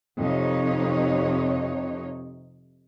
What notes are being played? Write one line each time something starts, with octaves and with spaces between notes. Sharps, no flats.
F2 C3 D#4 C#5